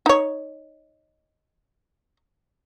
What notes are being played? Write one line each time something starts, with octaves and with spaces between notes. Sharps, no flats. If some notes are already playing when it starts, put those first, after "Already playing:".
D#4 C#5